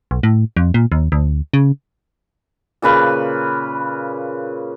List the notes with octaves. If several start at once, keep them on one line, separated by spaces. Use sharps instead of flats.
B1
A2
F2
A#2
D#2
D2
C#3
A#2 C#3 B4 F5